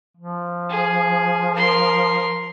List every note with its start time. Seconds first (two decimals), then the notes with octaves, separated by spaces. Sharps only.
0.17 F3
0.70 G#4
1.55 A#4 C6